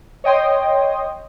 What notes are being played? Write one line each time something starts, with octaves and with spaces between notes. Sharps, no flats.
C#5 D#5 G5 C6 D#6